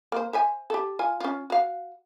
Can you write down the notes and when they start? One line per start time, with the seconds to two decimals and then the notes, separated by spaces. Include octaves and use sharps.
0.12 A#3 C5
0.33 C5 E5 G#5
0.70 G4 A4
0.99 F4 G#5
1.20 C#4 F4
1.50 F#4 F5